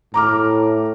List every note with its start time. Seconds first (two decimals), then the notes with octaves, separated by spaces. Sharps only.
0.14 A2 A#5 D6 F6